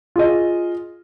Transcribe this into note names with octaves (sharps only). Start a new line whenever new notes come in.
F4 G#4 D#5